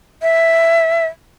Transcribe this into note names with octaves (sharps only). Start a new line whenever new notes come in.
E5